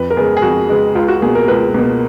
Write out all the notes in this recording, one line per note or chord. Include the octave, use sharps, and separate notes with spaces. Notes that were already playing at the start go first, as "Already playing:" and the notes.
Already playing: F2 B4
A#4
C#3 G#3 B3 G#4
G#4
F2 F#4
C#3 G#3 B3
C#2 F4
F#4
B2 A#3 G#4
A#4
C#2 B4
B2 A#3